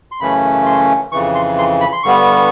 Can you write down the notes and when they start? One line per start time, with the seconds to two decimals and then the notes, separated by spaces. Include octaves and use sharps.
0.12 C6
0.20 F#2 C#3 E3 A3 C#4 B5
0.66 C6
1.12 F2 C#3 E3 C#6
1.35 C6
1.58 C6
1.81 B5
1.93 C6
2.03 G2 D3 G3 B3 C#6